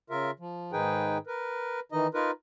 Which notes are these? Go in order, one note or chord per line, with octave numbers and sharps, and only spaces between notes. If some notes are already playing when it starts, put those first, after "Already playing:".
C#3 F4 A#4 E5
F3
G#2 D#3 D#4 G#4 B4 G5
A#4 B4
D#3 E3 D#4 D#5
D#4 F4 A#4 B4